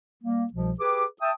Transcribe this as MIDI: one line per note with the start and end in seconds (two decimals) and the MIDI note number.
0.23 0.45 55
0.23 0.45 58
0.53 0.72 36
0.53 0.72 47
0.53 0.72 53
0.79 1.04 67
0.79 1.04 68
0.79 1.04 71
0.79 1.04 86
1.21 1.32 76
1.21 1.32 79
1.21 1.32 81
1.21 1.32 87